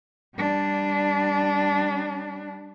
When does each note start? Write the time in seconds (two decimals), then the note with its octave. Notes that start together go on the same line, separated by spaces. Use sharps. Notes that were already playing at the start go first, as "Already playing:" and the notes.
0.35 G3 D4